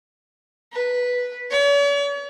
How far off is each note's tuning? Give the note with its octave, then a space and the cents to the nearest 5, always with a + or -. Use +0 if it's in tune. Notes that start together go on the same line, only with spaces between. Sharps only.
B4 -5
C#5 +45